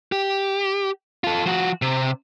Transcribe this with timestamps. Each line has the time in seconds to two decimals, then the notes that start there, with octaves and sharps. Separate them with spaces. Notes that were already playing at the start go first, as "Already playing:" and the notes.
0.12 G4
1.24 F4 A4
1.46 F3 F#4
1.82 C3